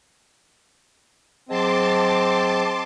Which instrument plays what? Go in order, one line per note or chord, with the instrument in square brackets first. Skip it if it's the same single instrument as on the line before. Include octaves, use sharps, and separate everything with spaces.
[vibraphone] F#3 G#4 D#5 [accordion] C4 [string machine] A5 C6 D6